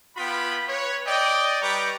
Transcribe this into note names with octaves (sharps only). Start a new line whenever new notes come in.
B3 F4 G5 B5
B4 C#5
D5 D#5 G5
G3 B4 G5 A#5 C#6 D6